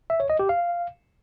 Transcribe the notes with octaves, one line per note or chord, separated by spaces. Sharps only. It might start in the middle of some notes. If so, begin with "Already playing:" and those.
E5
C#5
D#5
G4
F5